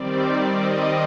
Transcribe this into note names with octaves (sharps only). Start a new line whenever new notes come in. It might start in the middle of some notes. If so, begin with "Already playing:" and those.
Already playing: D#3 G3 C4 D5
D#5